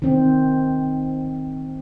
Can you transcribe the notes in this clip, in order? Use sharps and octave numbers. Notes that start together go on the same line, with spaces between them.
D#3 C4